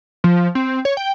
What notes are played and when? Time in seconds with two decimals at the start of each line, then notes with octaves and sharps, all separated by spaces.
0.24 F3
0.55 C4
0.85 C#5
0.97 G5